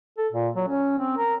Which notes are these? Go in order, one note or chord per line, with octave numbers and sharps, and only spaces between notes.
A4
A#2
F#3
C#4
C4
A#4